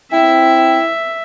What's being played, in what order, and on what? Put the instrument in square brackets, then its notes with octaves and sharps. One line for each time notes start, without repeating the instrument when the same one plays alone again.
[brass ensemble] C4 G5 [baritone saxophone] E4 [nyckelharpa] E5